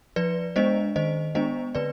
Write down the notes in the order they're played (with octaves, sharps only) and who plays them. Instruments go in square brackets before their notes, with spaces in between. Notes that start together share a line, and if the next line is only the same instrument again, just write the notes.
[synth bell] F3 B4 D5
G#3 B3 D4 C5 D#5
D#3 C5 D#5
G#3 B3 D4 C5 D#5
D3 B4 D5